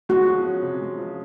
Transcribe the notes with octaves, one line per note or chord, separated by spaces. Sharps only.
G#3 F#4
F3
C#4
C3
G#3
F3